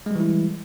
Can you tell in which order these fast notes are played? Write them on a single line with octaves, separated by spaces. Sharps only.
G#3 G3 E3 E4